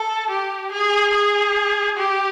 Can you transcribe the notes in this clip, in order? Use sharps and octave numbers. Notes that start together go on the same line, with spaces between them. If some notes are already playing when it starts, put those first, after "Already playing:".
Already playing: A4
G4
G#4
G#4
G4